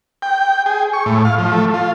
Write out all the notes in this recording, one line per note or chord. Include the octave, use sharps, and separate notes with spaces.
G5
G#4
C#6
A2
F5
F3
A3
F4